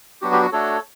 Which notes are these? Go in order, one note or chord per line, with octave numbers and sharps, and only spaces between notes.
F#3 B3 D4 F#4 G4
G4
F#4
A3 D4 F#4 A4 C#5